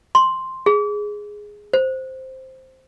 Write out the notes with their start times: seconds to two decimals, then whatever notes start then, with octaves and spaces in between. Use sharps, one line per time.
0.15 C6
0.66 G#4
1.73 C5